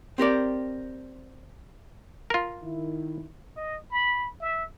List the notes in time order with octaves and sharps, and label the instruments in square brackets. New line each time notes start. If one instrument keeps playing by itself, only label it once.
[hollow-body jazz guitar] C4 G4 A#4 D5
[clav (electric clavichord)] F4 A#4
[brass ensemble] D#3 E4
[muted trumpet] D#5
B5
E5